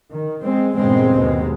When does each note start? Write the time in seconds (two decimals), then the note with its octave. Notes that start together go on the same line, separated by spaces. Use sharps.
0.11 D#3
0.43 G#3 C4
0.75 E2 G2 A#2 C#3 G#3 C4
1.17 D#2 B2 G#3